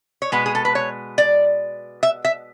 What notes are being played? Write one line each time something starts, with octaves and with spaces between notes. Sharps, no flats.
C#5
B2 G#3 B3 B4
G#4
A4
B4
C#5
D5
E5
E5